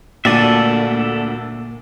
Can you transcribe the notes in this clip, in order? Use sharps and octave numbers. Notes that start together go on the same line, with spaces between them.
D2 A#2 A#3 A4 D5 E5 D#7